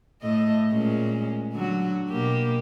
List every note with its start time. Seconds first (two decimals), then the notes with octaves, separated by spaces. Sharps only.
0.22 A2 A3 D#5
0.72 A#2 G#3 C#4
1.53 D3 F#3 F#4
2.09 B2 A#3 G4